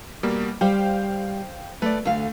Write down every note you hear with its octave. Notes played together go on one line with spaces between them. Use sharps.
B2 G3 A#3
G3 C5 F5 G5
A3 B4 D5
D2 A3 F5